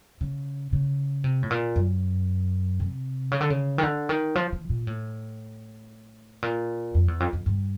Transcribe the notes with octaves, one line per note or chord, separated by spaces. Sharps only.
C#3
C#3
C3
A2
A#2
F#2
C3
C#3
D3
C#3
D#3
D3
D#3
F3
E3
A#2
A2
A#2
F2
E2
F2
F2
G2